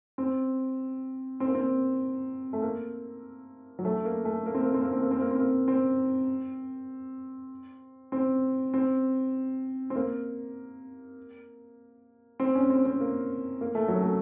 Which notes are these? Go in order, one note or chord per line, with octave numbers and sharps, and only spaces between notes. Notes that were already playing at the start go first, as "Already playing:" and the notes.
C4
C4
A#3
C4
A3
A#3
F#3
A3
A#3
A3
A#3
C4
A#3
C4
A#3
C4
A#3
C4
A#3
C4
A#3
C4
C4
C4
C4
A#3
C4
C#4
C4
C4
A#3
A#3
A3
F#3
A3